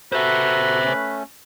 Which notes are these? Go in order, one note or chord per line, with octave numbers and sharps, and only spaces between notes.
F#4 A4 B4 C5 E5
A3 C#4